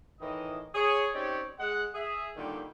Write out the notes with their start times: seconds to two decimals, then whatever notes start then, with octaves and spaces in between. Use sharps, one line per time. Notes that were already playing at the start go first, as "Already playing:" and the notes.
0.20 A2 D#3 E3 D#5
0.74 G#4 C#5
1.13 C4 C#4 D#4 G4 C#5 D5
1.58 G#3 F#5
1.94 G#4 E5
2.36 A#2 D3 D#3 F#3 G3